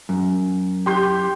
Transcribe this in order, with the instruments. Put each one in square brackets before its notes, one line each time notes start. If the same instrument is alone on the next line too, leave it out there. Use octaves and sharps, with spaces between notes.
[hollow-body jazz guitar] F#2
[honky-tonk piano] G4 C6 G6